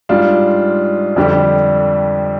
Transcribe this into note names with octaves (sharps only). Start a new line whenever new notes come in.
G#2 G3 D4 F4
F2 D3 G3 D4 G4